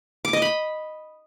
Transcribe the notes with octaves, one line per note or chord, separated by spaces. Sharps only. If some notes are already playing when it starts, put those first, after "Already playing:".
D6
D#5
B5